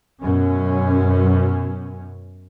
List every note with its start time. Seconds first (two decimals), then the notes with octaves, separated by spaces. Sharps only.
0.22 F#2 B2 C#4